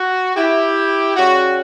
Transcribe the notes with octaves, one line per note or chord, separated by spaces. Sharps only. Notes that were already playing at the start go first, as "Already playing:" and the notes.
Already playing: F#4
E4 G4
C#3 G3 C#4 F#4